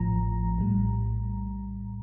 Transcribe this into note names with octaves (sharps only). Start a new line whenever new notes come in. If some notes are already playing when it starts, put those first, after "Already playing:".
Already playing: A1 A2 F3 A#5
A#1 A2 G3